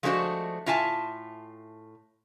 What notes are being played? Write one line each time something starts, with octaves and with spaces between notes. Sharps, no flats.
F3 G#3 A3 D4 F#4 C5
A2 F4 E5 G#5 A5